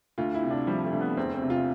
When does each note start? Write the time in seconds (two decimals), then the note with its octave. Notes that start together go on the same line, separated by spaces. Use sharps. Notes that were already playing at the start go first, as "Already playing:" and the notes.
0.18 D2 F4
0.34 E4
0.42 C3
0.51 D4
0.67 F3 G3
0.85 A3
0.93 D2
1.01 B3
1.17 E2 C4
1.34 C4
1.42 C3
1.50 F4